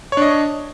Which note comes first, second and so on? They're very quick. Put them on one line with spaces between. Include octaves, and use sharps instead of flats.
C#5 D4 D#5